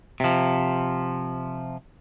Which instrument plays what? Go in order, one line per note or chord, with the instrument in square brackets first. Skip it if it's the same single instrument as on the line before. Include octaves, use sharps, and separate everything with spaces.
[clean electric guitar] C3 F3